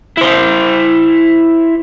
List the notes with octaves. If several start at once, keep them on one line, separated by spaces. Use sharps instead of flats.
E4 C5